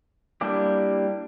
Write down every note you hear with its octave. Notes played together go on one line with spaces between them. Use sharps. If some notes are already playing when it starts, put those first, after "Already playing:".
G3 A#3 D4 E4 G4